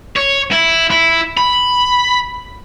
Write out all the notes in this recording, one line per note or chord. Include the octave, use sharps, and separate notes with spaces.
C#5
E4
E4
B5